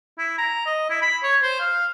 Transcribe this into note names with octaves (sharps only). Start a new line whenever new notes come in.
E4
A#5
D#5
E4
B5
C#5
C5
F5